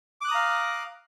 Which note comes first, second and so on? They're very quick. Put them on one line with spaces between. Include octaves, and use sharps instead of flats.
D6 F#6 D#6 A#5 F5